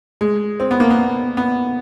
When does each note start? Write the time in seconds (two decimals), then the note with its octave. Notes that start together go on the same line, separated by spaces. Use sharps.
0.21 G#3
0.60 C4
0.71 B3
0.80 A#3
0.90 B3
1.37 B3